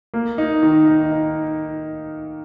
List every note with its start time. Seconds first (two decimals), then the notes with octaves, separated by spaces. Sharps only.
0.14 A#3
0.38 D#4
0.63 D#3
0.88 D#4
1.12 D#4